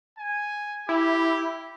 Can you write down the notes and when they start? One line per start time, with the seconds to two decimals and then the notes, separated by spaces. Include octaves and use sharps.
0.19 G#5
0.89 E4 G4